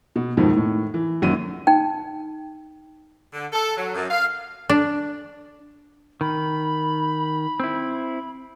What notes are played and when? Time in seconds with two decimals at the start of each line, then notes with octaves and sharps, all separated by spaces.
0.16 B2
0.37 F2 G#2 B2 D#3 F3
0.56 A2
0.94 E3
1.22 G#1 F#2 A#2 F#4 D#7
1.67 D#4 G5
3.33 D3
3.53 A4
3.77 F#3
3.95 F#2
4.10 F5
4.69 D4
6.21 D#3 B5
7.60 C4 E4